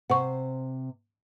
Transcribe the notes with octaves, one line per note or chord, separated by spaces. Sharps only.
C3 C5 F#5 C#6